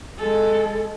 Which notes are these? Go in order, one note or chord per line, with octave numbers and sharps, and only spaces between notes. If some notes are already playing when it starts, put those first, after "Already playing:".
G#3 A4